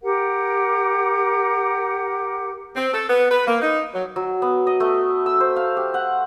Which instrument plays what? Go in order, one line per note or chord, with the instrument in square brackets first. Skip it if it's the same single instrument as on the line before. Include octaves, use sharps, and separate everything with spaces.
[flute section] G4 A#4 F#5
[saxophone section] C4
A4
B3
B4
A#3
D#4
F#3
[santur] F#3
B3
D#5
A3
E6
C5
F5
G4
F#5